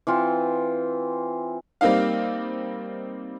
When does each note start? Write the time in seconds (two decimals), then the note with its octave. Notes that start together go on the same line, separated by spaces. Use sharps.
0.07 E3 C4 F4
1.81 G3 A#3 C4 D#4 F5